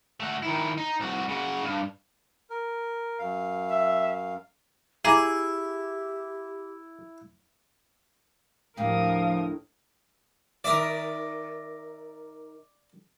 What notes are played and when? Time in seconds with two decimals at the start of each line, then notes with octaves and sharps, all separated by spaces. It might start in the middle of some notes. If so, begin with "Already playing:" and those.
0.20 A3 F#4
0.43 D#3 E4
0.78 D#4
1.00 C2 F#4
1.29 C#3 F#4
1.64 G2
2.50 A#4
3.19 F#2 F5
3.69 E5
5.05 E4 G4 G#4 G#5 A#5 D6
8.77 D2 A2 F3 G4 A#4 F5 D#6
10.64 D#3 A#4 D5 E5 D6 D#6